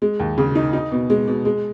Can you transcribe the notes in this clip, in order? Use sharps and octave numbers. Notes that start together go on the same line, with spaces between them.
G#3
D#2
C#3
D#4
D#4
B2
G#3
B2
G#3